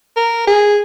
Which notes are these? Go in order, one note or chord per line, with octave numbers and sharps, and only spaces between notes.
A#4
G#4